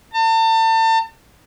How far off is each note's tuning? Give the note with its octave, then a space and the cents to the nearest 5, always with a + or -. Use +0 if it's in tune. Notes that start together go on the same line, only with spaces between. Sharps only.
A5 +40